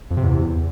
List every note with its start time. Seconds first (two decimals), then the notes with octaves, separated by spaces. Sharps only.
0.11 F2
0.17 C3
0.24 E2